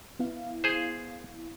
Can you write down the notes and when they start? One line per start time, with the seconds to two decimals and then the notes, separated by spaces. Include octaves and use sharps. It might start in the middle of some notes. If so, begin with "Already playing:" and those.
0.19 B3 E4 F5
0.64 G#4 C5